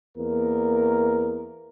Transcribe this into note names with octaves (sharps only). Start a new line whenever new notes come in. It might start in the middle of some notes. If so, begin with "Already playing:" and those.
E2 A#3 A#4